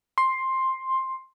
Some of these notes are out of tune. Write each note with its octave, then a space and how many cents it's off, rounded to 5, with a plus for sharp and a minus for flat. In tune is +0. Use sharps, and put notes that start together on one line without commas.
C6 +10